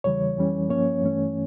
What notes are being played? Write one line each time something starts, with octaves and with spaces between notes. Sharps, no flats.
E2 C#3 E3 G3 C#5
F2 E3 G3 C#4
G2 F3 A#3 C#4 C#5
G2 E3 A3 C#4